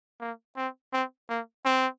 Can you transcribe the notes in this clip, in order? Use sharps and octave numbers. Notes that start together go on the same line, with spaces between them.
A#3
C4
C4
A#3
C4